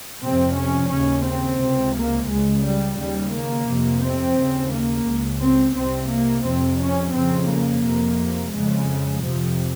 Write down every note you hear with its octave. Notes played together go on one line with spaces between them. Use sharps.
F2 C3 C4
C#4
D#2 C#3 C#4
C4
C#2 C3
A#3
C#2 C#3 G#3
G3
D#2 C#3 G3
A#3
F2 C3
C4
D#2 C#3
A#3
C#2 C#3
C4
C2 C3 C4
A#3
F2 C3 C4
C#4
F2 C#3 C4
A#3
F2 C3
F2 C#3 G#3
F2 C3 F3